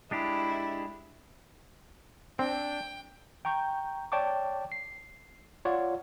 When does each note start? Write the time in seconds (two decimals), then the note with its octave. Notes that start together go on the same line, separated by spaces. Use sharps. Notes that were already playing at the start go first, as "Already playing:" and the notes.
0.11 G#3 D4 E4 G4
2.39 C4 D4 G5
3.45 G5 A#5 C#6 G6
4.12 C#5 D5 G5 A5 C#6 D6
4.72 C7
5.65 F4 C#5 D5 F#5